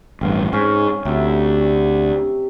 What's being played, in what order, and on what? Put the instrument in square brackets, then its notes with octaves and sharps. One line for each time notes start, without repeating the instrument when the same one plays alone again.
[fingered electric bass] A1 G2 [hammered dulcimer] C4 F5
[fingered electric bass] G#2 [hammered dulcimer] C#4
[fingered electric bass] D2 [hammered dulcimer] C3 E5